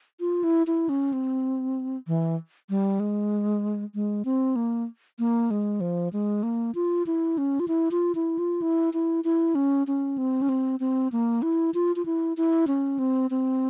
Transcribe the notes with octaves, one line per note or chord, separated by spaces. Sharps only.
F4
E4
E4
C#4
C4
E3
G3
G#3
G#3
C4
A#3
A#3
G#3
F3
G#3
A#3
F4
E4
C#4
F4
E4
F4
E4
F4
E4
E4
E4
C#4
C#4
C4
C#4
C4
C4
A#3
E4
F4
F4
E4
E4
C#4
C4
C4